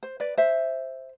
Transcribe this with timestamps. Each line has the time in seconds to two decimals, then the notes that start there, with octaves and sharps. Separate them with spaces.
0.03 C5
0.20 B4 D5
0.37 C5 E5